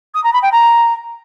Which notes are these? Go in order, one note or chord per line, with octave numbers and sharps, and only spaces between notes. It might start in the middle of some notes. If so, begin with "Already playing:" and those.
D#6
A#5
B5
G5
A#5